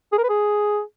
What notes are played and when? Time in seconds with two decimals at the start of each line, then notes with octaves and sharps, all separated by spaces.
0.13 G#4
0.18 A#4
0.24 B4
0.29 G#4